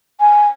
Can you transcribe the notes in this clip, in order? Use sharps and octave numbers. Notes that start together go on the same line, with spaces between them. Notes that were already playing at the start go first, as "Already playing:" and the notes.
G#5